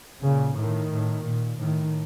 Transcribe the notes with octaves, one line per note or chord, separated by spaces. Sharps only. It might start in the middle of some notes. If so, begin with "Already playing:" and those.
A#2 C#3
A2 D#3
A2
A#2
A2 D#3